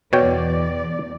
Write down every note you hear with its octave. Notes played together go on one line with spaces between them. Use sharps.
E2 B2 C#5 D5 G5